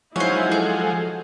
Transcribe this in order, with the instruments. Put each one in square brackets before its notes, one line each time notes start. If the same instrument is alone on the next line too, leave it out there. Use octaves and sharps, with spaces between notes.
[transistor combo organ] F3 F#3 G#3 [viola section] C#4 D#4 E4 [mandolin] C5 C#5
[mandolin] G#4 [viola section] A4